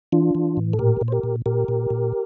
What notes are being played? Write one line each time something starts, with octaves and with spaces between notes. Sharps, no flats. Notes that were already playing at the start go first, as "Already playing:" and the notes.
E3 D4 F4
E3
A2
A4
A#2 G4 A#4
A#2
C5
G4 A#4
A#2
A#2 G4 A#4
A#2
A#2